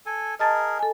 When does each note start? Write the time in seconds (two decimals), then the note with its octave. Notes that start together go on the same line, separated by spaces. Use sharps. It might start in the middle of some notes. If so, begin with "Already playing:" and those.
0.06 A4 G#5
0.39 G#4 A#4 D#5 A5 A6
0.79 A4 G#5